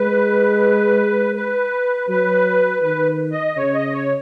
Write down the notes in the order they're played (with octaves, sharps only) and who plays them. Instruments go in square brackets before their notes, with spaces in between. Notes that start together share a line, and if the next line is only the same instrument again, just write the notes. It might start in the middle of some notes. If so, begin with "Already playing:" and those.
Already playing: [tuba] G#3 [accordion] B4
[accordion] B4
[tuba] F#3 [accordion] B4
[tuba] D#3 [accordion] B4
[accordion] D#5
[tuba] C#3 [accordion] C#5
[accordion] D#5
C#5